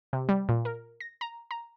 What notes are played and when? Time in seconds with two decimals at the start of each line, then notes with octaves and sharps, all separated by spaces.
0.13 C3
0.29 G3
0.49 A#2
0.65 A#4
1.00 A#6
1.21 A#5
1.51 A#5